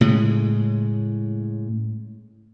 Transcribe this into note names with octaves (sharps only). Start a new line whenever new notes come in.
A2 C#3 G#3